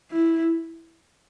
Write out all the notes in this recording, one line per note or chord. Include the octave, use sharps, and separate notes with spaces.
E4